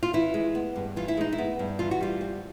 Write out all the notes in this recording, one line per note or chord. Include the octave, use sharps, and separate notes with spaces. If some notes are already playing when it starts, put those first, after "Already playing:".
F4
E3 E4
G#3
B3
G2
E3 F4
E4
G#3 D#4
E4
B3
G2
E3 F4
F#4
G3 F4
C4